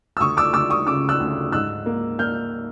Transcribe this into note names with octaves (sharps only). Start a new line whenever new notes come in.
E6
D2 C#6 D#6
D6 E6
D2 D6 E6
C#6 D#6
C#3 D6 E6
E6 F#6
D2
G#2 E6 F#6
A#3
A#3 F6 G6